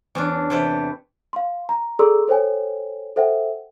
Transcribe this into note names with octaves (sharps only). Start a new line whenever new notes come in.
E2 C#4 D4
E2 C3 G4 A4 B4
F5 C6
A#5
G#4 A4 D5 A#5 C6 E6
A4 C5 C#5 G5 G#5
A4 C5 E5 F#5 G5